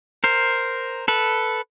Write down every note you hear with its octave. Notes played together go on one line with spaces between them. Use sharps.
A#4 C5
A4 B4